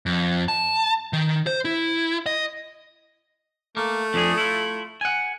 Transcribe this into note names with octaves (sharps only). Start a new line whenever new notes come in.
F2
A5
D#3
C5
E4
D#5
A3 A#3
F2 D4 G#4
E4 F4
F#5 G#5